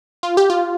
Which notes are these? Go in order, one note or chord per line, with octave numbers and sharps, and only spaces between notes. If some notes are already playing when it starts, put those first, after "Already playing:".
F4
G4
F4